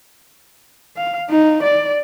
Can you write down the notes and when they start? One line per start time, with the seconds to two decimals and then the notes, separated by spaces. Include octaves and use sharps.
0.97 F5
1.30 D#4
1.63 D5